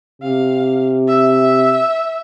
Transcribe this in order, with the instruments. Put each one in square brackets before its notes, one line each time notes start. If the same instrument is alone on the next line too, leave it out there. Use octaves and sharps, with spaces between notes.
[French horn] C3 [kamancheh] F5
[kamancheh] E5